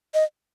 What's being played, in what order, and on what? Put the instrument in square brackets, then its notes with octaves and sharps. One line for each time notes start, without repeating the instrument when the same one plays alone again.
[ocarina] D#5